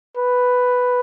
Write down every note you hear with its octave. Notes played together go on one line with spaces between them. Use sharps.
B4